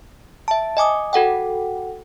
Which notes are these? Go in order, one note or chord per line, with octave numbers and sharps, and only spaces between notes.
E5 A5
D#5 G#5 D6 D#6
F#4 A4 F#5 G5